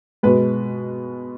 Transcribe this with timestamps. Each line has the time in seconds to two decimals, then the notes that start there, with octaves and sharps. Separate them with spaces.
0.23 B2 G#3 B4